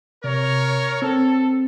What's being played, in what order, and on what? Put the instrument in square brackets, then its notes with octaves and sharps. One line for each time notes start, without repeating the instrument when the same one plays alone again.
[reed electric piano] C3 [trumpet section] A#4 C#5
[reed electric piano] C4 [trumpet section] A4